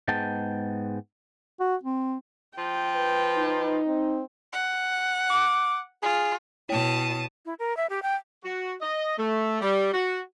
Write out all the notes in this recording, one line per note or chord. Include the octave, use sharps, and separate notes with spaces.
G#2 G#3 B3 G5 A5
F#4
C4
F3 G5
B4
D#4
C4
F#5
D6
F4 G#4
B2 E4 C#5 G5 A5 D#6
E4
A#4
E5
G4
G5
F#4
D#5
A3
G3
F#4